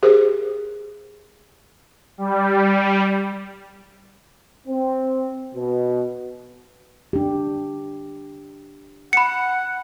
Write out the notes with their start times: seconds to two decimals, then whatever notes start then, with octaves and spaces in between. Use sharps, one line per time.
0.03 G4 G#4 A#4 C5
2.18 G3
4.67 C4
5.55 B2
7.13 D4 G4
9.13 F#5 B5 C#7